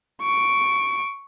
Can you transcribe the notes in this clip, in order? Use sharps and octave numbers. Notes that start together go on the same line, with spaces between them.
C#6 D7